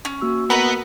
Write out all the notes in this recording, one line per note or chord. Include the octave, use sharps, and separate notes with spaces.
C#4
A#3 F#4 E6
B3 A#4 B4 D#5